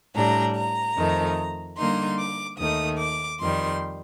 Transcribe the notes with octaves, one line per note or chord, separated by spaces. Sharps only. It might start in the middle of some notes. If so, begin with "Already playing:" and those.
A2 G3 D4 A#5
A#5
F2 D#3 A3
D3 G3 A#3 D#4 C6
D6
D#2 D#3 A3 D#6
D6
F2 D#3 G3 C6